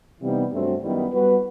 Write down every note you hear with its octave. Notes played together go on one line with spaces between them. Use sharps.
C3 E3 G3 B3 D#4
G2 F#3 A3 C4 F#4
F#2 D#3 G3 B3 E4
G3 B3 F#4 B4